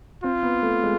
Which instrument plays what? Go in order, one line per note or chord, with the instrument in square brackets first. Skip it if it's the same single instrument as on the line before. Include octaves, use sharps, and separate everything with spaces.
[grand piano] C4 [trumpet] F4
[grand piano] B3
A3
G#3